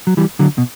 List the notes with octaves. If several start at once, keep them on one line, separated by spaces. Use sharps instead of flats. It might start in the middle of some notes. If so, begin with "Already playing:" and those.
F#3
E3 G3
D3 F#3
B2